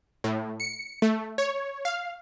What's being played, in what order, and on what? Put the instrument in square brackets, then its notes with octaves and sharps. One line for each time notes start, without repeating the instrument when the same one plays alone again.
[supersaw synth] A2
C#7
A3
C#5
F5